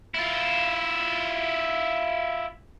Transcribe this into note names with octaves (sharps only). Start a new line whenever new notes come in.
E4 F4